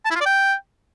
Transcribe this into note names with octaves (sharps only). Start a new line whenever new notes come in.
A5
E4
F4
D5
G5